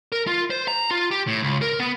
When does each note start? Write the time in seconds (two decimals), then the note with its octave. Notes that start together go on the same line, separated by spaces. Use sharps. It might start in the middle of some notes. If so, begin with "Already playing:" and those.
0.12 A#4
0.27 F4
0.50 C5
0.68 A#5
0.91 F4
1.11 G4
1.27 A2
1.42 C#2
1.62 A#4
1.80 B3